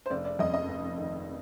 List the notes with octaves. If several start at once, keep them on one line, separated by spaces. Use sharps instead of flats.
C5
F1 D5
D5
F2 D#5
D#5
F1
D#3